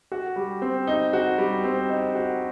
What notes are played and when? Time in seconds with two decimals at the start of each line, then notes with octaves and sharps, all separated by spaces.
0.12 F#4
0.36 G3
0.62 C4
0.87 D#4
1.13 F#4
1.38 G3
1.64 C4
1.89 D#4
2.15 F#4